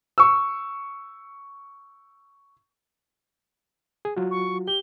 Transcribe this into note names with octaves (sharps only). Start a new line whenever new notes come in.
C#6 E6
G#4
F#3 F4 F#4
C#6
G4 G7